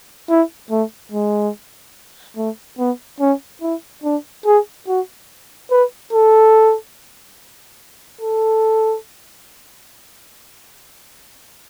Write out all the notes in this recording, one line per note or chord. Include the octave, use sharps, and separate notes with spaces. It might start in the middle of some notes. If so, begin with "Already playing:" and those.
E4
A3
G#3
A3
B3
C#4
E4
D4
G#4
F#4
B4
A4
A4